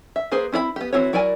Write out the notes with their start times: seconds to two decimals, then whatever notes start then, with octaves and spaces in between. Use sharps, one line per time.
0.16 E5
0.31 A#3 G#4 B4 C5
0.52 C4 E4 D5 B5
0.76 B3 G4
0.93 E3 C4 E4 F#4 C#5
1.13 F#3 E4 A#4 D5 G#5